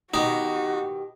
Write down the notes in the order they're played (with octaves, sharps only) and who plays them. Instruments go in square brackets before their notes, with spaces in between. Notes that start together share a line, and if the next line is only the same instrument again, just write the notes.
[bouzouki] B2 D#3 G4 [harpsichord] D#4 [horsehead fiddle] F#4